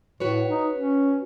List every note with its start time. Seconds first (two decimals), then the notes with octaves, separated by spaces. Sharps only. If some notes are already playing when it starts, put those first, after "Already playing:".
0.20 A2 F#4 B4 C#5
0.48 D#4
0.75 C#4